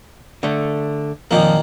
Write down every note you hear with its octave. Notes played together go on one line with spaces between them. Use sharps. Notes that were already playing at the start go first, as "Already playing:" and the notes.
D3 A3
F2 A#2 D#3 F3 A#3